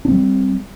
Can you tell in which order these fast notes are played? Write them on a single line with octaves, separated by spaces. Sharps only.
D4 C4 G3